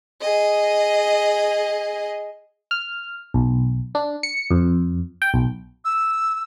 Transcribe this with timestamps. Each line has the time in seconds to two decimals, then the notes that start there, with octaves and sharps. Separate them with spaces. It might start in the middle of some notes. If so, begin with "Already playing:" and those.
0.21 G#4 D#5
2.71 F6
3.34 B1
3.95 D4
4.23 C#7
4.51 F2
5.22 G5
5.34 B1
5.85 E6